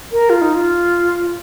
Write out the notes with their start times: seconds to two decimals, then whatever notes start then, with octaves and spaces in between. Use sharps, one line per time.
0.12 A#4
0.30 F4
0.42 D#4
0.54 F4